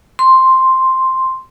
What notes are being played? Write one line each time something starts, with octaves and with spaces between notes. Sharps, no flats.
C6